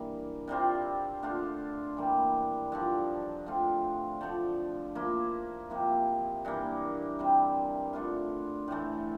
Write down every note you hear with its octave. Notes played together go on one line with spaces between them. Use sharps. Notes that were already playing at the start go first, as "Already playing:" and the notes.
Already playing: G2 E3 A#3
C3 G3 C4 F4
D3 A3 D4 F4
E3 G3 A#3
G2 D3 F3
D3 A3 C4 F4
D3 F3 A3
F3 A#3 E4
C3 F3 A#3 E4
G2 E3 A#3
C3 G3 C4
D3 A3 D4 F4
A2 E3 A3